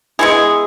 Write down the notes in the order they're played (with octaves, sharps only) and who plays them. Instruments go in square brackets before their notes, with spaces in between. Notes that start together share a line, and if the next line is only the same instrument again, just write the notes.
[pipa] G#3 B3 E4 G#4